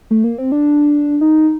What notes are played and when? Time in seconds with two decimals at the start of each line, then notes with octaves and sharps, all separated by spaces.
0.11 A3
0.24 A#3
0.38 C4
0.52 D4
1.21 D#4